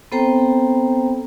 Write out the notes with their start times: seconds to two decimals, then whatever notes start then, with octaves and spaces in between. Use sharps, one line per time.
0.12 B3 C4 A4 C5 G5 A#5